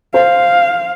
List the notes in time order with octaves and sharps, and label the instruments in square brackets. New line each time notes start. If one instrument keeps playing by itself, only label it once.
[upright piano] C5 [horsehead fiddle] F5